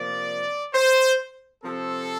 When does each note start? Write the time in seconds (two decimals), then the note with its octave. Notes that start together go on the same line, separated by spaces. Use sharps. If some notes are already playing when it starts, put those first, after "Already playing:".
Already playing: C3 F3 A#3 D5
0.74 C5
1.63 C3 F3 C4 A4